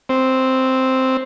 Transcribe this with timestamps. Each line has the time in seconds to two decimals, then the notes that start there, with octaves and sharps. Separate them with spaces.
0.09 C4